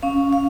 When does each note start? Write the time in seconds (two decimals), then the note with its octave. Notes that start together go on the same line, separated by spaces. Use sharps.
0.03 C#4 F5
0.33 F5